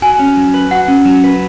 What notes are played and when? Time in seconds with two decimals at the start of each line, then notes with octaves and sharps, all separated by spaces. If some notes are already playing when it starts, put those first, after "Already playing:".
0.02 F#4 G#5
0.20 C#4
0.37 F#3
0.54 B4
0.71 F#4 F#5
0.88 C#4
1.05 F#3
1.24 B4